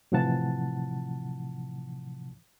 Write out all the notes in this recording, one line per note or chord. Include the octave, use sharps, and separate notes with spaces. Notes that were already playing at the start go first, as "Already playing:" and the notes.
A2 C3 E3 F3 F#5 A5